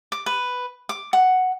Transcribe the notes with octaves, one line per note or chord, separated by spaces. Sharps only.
D6
B4
D6
F#5